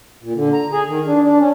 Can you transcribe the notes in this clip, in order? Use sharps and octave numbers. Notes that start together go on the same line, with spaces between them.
A#2
D3
A#5
G#4
D#3
D4
D4
C#4